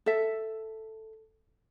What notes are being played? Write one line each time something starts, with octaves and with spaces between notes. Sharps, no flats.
A4 E5